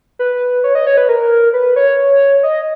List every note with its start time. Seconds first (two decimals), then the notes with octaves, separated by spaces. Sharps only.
0.19 B4
0.64 C#5
0.75 D#5
0.87 C#5
0.97 B4
1.09 A#4
1.54 B4
1.76 C#5
2.43 D#5